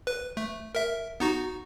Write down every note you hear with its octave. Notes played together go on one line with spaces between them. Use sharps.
B4
A3
A#4 E5
B3 D#4 F#4